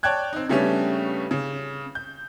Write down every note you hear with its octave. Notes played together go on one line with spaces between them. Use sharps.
C#5 D5 G5 A5 F#6 G#6
C4 D#4
C#3 G3 A3 B3 C#4 D4
C#3
G6